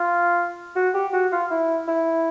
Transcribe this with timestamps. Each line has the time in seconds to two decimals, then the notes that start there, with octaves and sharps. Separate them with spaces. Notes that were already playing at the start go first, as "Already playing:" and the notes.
Already playing: F4
0.76 F#4
0.94 G4
1.13 F#4
1.32 F4
1.51 E4
1.88 E4